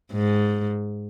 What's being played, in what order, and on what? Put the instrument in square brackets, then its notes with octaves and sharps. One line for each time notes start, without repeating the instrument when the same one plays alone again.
[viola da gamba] G#2